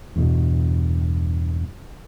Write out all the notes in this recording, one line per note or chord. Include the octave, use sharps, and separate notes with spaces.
E2 G2 B2